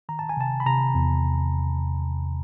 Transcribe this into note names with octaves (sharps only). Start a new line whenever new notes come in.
D#3 A#5
A5
G#5
C3 A5
B5
C3 A#5
E2